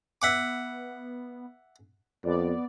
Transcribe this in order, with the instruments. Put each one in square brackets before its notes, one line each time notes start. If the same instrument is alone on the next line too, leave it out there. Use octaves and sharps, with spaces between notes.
[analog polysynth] B3 [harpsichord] E5 F#5 D6
[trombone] F2 [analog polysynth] B3 D5